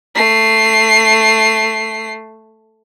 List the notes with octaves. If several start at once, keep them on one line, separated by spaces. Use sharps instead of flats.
A3 C7